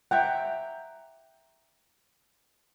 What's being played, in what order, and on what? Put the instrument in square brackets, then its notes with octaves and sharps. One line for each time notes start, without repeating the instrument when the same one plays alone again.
[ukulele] E5 A#5 [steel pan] F#5 G5